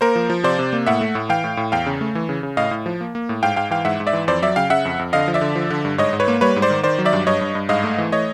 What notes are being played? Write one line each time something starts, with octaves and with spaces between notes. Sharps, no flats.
A#3 A#4 C5
F3
F3
C3 C5 D5
C3
A#3
A2 E5 F#5
A3
A2
E3 F5 G5
A2
A2
E2 F5 G5
C#3
A3
E3
C#3
C#3
A2 D#5 F5
A2
F3
A#3
A#3
A2
G#2 F5 G5
G#2 F5 G5
E3 F5 G5
G#2 E5 F#5
G#2
D5 E5
E3
F2 C5 D5
F#3 D5 E5
C#3 F5 G5
C#3 E5 F#5
F2
F2
D3 D#5 F5
F3
D5 E5
D3
F3
D3
G2
G#2 C#5 D#5
G#2
B4 C#5
A#3
G3 B4 C#5
G#2
C5 D5
D#3
D#3 C5 D5
F#3
D5 E5
G2
G2 C#5 D#5
G2
G2
G#2 D#5 F5
A3
E3
A3 C#5 D#5